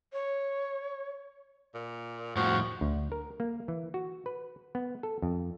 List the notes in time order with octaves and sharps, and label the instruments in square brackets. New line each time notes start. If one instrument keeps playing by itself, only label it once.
[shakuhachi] C#5
[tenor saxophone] A#2
[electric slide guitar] F2 A2 [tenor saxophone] F3 [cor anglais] F#4
[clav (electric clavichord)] D2
A#4
A#3
E3
F#4
B4
B3
A4
F2